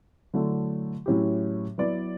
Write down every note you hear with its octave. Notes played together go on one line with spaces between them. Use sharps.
D3 F#3 A3 E4 A4
A2 F#3 C#4 E4 G4
F#3 B3 E4 B4 D5